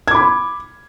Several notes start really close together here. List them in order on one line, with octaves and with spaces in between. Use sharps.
G#6 D6 B5